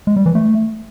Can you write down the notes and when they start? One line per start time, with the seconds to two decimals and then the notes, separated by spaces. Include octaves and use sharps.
0.07 G#3
0.16 G3
0.26 E3
0.35 A3